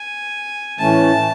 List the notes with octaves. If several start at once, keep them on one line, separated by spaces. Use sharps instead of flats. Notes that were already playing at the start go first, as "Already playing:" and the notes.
Already playing: G#5
A2 E3 A3 C#4 A5